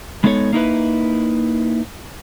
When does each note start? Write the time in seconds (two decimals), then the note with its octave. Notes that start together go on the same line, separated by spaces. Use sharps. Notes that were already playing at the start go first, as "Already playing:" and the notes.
0.24 G#3 B3 D#4 A4 C5 C#5
0.53 A#3 D#4 E4 B4